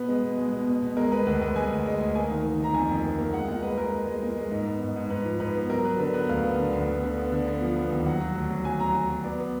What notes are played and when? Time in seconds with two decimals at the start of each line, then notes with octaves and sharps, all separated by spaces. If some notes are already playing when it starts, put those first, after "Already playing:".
Already playing: B2 B3 B4
0.08 G#3
0.23 B2
0.38 G#3
0.53 B2
0.68 B2
0.82 B2
0.97 G#3 A#4
1.12 G#3 B4
1.27 D2 B4
1.41 D2 B4
1.56 G#3 G#5
1.71 D2
1.86 G#3
2.01 D2
2.15 A#3 G#5
2.31 D#3
2.45 D#3
2.60 D#3 A#5
2.74 F2 G#5
2.89 F2
3.04 A#3
3.18 A#3
3.33 G#3 F#5
3.48 A#2 F#5
3.63 G#3 B4
3.78 G#3 A#4
3.93 G#3
4.07 G#3
4.22 A#2
4.37 G#3
4.51 G#2
4.67 B3
4.81 G#2
4.96 G#2
5.10 G#2 B4
5.25 F3
5.40 G#2 B4
5.55 B3
5.70 F#3 A#4
5.84 F#3 B4
5.99 D3 B4
6.14 B3 B4
6.29 D2 F5
6.44 B3
6.58 D3
6.73 D2
6.88 B3
7.03 D3
7.18 B3
7.32 D3
7.47 B3
7.62 F3
7.76 B3
7.91 D#2
8.06 F#3 F#5
8.21 F#3
8.36 D2
8.50 F#3
8.65 F#3 G#5
8.80 F#3 A#5
8.94 F#3 G#5
9.10 F#3
9.24 B3 D5
9.39 B3